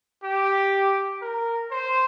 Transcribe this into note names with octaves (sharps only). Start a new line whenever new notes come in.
G4
A#4
C5